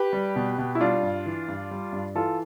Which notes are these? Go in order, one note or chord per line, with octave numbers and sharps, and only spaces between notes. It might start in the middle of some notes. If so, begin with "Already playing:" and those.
Already playing: G4 B4
G3
B2
B2
E4
G3 D4 F4
G2
E3
G2
G3
G2
E3 F4 A4